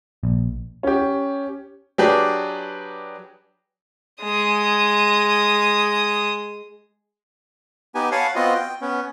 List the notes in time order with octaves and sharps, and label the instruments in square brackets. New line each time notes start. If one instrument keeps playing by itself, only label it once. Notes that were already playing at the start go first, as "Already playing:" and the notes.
[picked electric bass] A#1
[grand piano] C#4 G4
F#3 D4 G4 G#4 B4
[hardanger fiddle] G#3 D#6
[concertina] B3 D#4 G4 G#5
C#5 F5 F#5 G#5 A5 B5
B3 C4 F4 F#4 D#5
G5
B3 C#4